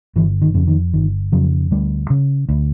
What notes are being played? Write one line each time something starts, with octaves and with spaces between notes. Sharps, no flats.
G1 E3
D#3
F2 C#3
D#3
G1 D#3
F2 C#3 F#3
D2 G3
C#3
D2